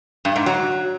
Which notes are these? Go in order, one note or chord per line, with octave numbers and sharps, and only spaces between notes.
G2
G#2
F#3